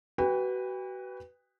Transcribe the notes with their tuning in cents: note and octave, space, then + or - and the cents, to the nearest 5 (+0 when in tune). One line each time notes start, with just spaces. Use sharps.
F#4 +30 B4 +0 G5 +40